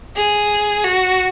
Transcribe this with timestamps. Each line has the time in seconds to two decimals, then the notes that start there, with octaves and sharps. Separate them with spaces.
0.16 G#4
0.84 F#4